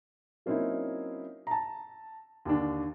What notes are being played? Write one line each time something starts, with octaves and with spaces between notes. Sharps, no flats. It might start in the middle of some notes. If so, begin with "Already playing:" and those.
F#3 A#3 C4 C#4 D#4 E4
A5 A#5
D#2 D3 D4